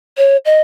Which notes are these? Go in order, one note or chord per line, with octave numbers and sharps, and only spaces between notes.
C#5
D#5